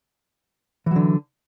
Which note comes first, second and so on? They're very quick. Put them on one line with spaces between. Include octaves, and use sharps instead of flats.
E3 F#3 D3